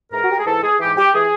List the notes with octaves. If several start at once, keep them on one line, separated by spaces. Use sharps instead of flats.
G#2 E3 A#4
F#4
G4
G#4
G#2 E3 A4
G#4
G#2 E3 G4
G4
E3 G#4